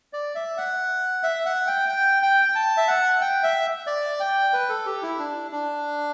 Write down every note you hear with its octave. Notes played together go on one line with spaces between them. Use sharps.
D5
E5
F#5
E5
F#5
G5
G5
G5
G5
A5
E5
F#5
G5
E5
D5
G5
B4
A4
G4
E4
D4
D4